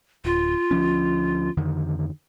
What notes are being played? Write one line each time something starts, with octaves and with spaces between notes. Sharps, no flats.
D1 F4
D2 F3 C#4
F2 D3 D#3